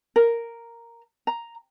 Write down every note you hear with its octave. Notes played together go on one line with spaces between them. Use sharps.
A#4
A#5